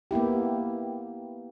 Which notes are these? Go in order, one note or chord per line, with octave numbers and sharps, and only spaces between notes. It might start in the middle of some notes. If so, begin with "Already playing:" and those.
A#3 B3 E4 G4